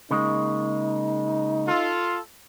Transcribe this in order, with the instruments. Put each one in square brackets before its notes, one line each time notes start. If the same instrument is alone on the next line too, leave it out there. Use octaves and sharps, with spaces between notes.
[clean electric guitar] C#3 G#3 A#3 [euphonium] D#4
[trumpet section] F4 A4